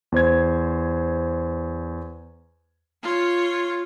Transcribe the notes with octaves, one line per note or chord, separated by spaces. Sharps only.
E2 C5 G#6
F4 C#5